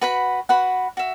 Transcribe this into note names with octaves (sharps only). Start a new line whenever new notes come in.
F#4 B4 F#5 B5
F#4 B4 F#5 B5
F#4 E5